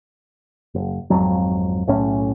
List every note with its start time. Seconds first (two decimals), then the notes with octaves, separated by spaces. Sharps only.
0.74 F#1
1.10 G#1 F2 F#3
1.87 B1 A2 C#4